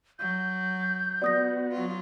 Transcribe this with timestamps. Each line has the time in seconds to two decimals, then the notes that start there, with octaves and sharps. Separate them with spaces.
0.19 F#3 G6
1.22 B3 F#4 D5 D#6 A#6
1.72 F#3 F4